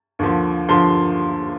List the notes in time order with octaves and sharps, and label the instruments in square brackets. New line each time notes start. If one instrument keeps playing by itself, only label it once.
[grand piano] D#2 D3 F3
D3 F3 C6